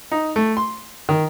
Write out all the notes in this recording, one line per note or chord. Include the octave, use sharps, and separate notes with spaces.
D#4
A3
C6
D#3